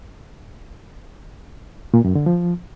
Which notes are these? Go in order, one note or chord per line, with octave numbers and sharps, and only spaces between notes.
A#2
F#2
D3
F3